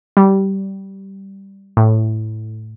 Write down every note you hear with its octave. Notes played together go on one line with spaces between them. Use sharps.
G3
A2